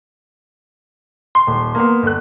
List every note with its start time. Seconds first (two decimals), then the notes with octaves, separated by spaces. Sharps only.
1.35 C6
1.47 D#1
1.75 A#3 B3
2.03 G1 F#6